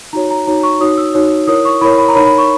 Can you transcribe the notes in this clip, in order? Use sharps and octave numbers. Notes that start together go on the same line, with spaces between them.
D#4 F#4 C#5 A#5
A#5
D#4 F#4 C#5 A#5
C#6
D#4 F#4 C#5 D#6
E6
D#4 F#4 C#5
E4 A#4 C#5 D#6
C#6
E4 A#4 C#5 B5
B5
A#5
D#4 A#4 C#5 B5
B5
C#6